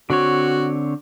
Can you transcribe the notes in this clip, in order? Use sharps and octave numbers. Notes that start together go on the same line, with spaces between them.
D3 C4 F#4 C#5